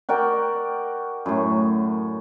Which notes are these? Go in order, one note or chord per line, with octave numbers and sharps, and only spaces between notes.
F#4 A#4 D5 G5
F#2 A2